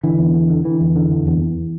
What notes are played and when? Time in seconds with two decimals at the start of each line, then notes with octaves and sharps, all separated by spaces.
0.03 D3 E3
0.19 E2
0.34 D3
0.49 D3
0.65 D3 E3
0.80 E2
0.96 D3
1.11 E2
1.27 E2
1.42 E2